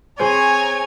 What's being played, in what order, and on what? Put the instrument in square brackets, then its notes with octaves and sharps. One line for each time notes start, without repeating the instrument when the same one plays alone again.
[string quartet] C4 G#5 A#5 [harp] G#4 C5 [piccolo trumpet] C#5